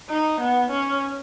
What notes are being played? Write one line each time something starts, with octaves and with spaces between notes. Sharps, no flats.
D#4
B3
C#4